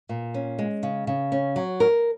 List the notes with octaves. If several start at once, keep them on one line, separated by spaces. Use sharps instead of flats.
A#2
C#4
G#3
C#3
C#3
C#4
F#3
A#4